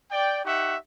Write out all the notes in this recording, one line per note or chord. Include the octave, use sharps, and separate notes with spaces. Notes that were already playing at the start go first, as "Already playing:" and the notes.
D5 G5
D#4 G4 E5 F#5 C#6